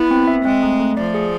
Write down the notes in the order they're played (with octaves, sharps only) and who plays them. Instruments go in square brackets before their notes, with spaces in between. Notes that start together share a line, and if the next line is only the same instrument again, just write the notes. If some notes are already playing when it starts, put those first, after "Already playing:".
Already playing: [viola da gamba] B3 [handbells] E4
[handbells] C4
E5
[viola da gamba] G#3 [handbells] C4
[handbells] A3
A3
[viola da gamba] F3 [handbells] D5
[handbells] G#4